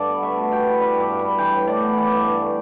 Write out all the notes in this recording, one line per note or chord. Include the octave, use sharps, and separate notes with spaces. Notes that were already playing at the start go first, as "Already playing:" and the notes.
Already playing: G2 D3 A4 D5
B3
A3 E5
B2
B2 G5
E4
G3 B5
G2
D6
G2
D4 B5
E3 G5
A2
A2 D5
B3
E3 D5
G2
G2
A3